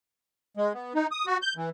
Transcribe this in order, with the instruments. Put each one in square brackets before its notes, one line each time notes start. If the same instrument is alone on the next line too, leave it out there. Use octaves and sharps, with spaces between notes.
[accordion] G#3
B3
D#4
D#6
F#4
G6
E3